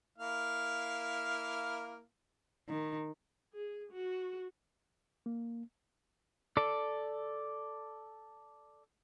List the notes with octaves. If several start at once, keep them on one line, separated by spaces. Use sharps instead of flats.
A#3 E4 F5
D#3
G#4
F#4
A#3
A4 D5